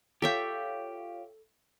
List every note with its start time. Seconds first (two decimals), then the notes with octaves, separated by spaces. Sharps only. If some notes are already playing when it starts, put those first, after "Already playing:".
0.22 F4 G4 A4 C#5 E5 F5 G5